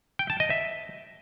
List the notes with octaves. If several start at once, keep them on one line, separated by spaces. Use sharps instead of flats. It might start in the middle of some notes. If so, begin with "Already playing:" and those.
G5
A5
D#5
E5